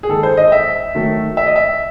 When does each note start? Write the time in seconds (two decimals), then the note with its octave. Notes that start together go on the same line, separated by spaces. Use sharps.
0.03 G#4
0.09 D#3 G#3 A4
0.23 C5
0.37 D#5
0.52 E5
0.95 D#3 F#3 A3
1.37 E5
1.46 D#5
1.56 E5